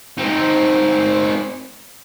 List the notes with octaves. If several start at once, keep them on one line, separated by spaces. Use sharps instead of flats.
C4 D#4